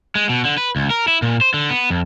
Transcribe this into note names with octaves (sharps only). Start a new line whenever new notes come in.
G#3
B2
D3
B4
C#2
A#4
E4
A#2
C5
D3
B3
F2